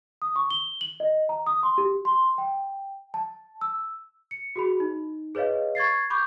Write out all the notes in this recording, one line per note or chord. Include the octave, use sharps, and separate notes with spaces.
D#6
C#6
G7
F#7
D#5
A#5
D#6
C6
G4
C6
G5
A5
E6
C#7
F#4 G#4 B5
D#4
G#4 B4 C#5 D#5 F5
C#6 G#6 A6 C7
B5 C#6 D6 G6